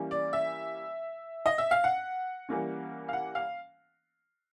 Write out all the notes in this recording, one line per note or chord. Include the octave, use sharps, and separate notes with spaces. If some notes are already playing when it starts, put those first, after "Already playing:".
Already playing: E3 G3 A#3 C#4
D5
E5
D#5
E5
F5
F#5
E3 G3 A#3 C#4
F5
F#5
F5